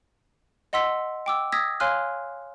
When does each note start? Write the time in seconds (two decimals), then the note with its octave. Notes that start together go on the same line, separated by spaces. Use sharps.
0.73 D#5 F#5 C6 E6 B6
1.26 G5 D6 E6
1.52 D#6 E6 G#6 A#6 B6
1.80 C#5 F5 G#5 C6 F6 F#6